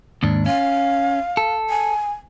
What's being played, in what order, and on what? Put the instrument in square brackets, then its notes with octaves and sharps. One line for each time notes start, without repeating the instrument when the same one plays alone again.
[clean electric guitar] D#2 G#2 D4
[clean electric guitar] C#4 [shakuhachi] F5
[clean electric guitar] A4
[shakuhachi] G#5